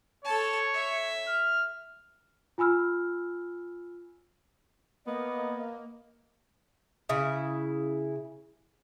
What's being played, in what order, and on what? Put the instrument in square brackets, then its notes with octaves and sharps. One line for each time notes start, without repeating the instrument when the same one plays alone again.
[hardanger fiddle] A4 A5 [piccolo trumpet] C#5
[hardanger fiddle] E5
[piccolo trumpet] F6
[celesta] F4 G#5 B5 E6 F6
[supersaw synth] A#3 [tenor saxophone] B3 [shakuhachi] D#5
[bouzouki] C#3 E4